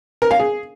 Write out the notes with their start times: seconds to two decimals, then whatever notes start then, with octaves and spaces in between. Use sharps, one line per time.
0.22 A#4
0.31 F5
0.40 G#4